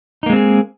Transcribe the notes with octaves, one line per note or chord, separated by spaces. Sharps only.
G#3 A#3 C4 D#4 G#4